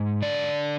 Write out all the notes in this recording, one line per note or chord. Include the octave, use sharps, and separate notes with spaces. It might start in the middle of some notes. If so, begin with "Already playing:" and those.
Already playing: G#2
D3 D5